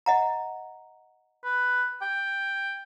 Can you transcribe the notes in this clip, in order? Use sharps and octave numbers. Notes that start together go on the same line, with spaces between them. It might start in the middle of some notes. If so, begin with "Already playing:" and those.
D#5 F#5 A#5
B4
G5